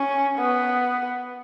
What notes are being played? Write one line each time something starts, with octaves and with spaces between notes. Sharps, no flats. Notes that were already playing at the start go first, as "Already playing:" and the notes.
Already playing: C#4
B3